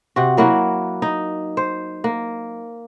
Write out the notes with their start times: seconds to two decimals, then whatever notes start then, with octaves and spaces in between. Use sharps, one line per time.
0.16 C3 F#4
0.37 F#3 A#3 E4 F#4
1.02 D#4
1.57 C5
2.04 A#3